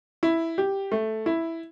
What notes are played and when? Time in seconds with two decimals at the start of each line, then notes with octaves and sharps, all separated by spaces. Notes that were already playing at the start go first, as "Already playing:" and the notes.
0.23 E4
0.58 G4
0.92 A3
1.26 E4